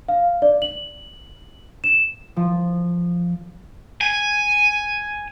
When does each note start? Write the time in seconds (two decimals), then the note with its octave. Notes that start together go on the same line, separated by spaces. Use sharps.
0.09 F5
0.42 D5
0.62 F#7
1.84 E7
2.36 F3
4.01 G#5